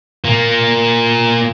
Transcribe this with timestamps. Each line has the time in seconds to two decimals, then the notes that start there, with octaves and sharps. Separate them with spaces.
0.25 A#2 A#3